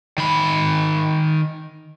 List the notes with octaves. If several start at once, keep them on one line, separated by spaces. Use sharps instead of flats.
D#3 B5